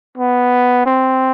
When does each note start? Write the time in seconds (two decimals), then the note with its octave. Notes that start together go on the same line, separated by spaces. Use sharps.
0.18 B3
0.86 C4